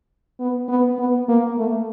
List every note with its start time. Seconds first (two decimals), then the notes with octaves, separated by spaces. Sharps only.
0.40 B3
0.69 B3
0.98 B3
1.28 A#3
1.58 A3